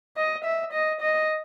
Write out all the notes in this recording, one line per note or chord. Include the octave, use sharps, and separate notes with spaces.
D#5
E5
D#5
D#5